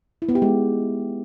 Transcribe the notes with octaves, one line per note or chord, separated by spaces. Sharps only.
E4
B3
G4
G#3